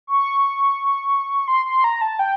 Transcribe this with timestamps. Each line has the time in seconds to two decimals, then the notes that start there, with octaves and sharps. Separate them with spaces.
0.07 C#6
1.48 C6
1.65 C6
1.84 A#5
2.01 A5
2.19 G5